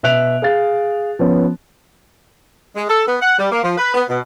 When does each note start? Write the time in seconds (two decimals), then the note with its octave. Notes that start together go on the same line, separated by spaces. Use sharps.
0.03 B2 E5 F#6 D7 F7
0.42 G#4 F5 A6
1.19 F3 B3 C#4
2.76 G#3
2.89 A4
3.07 B3
3.21 F#5
3.39 G3
3.52 A#3
3.64 F3
3.78 B4
3.94 B3
4.09 B2